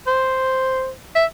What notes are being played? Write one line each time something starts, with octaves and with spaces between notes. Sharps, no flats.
C5
E5